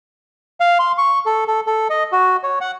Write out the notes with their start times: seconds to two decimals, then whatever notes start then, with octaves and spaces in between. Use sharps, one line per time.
0.60 F5
0.79 C6
0.98 C#6
1.26 A4
1.47 A4
1.67 A4
1.90 D#5
2.12 F#4
2.43 C#5
2.61 F#5